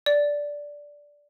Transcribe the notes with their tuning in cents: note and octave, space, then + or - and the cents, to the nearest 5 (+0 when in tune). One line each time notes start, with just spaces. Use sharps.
D5 -5